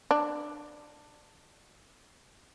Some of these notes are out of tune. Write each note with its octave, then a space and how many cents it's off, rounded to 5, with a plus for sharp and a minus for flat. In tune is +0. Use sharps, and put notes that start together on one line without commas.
D4 +20